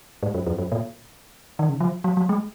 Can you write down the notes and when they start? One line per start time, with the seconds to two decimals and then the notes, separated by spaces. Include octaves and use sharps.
0.23 G#2
0.34 F#2
0.47 F2
0.58 F#2
0.72 A#2
1.59 D#3
1.69 C#3
1.80 F3
2.04 F#3
2.17 F#3
2.29 G#3